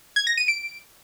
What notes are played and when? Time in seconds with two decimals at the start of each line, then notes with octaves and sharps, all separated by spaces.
0.16 G#6
0.27 A#6
0.37 D#7
0.48 D7